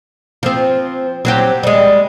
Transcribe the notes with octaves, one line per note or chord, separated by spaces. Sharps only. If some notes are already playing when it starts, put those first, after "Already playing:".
F3 C4
F#3 C4 G4
G3 G#3